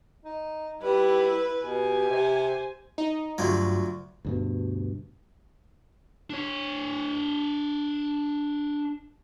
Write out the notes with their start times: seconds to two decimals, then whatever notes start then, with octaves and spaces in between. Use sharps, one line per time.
0.25 D#4
0.82 G3 E4 B4
1.64 B2 G4 G#5
2.10 C3 C5
2.98 D#4
3.38 D2 G2 F3 F#3
4.25 D2 G2 B2
6.30 D4 C#5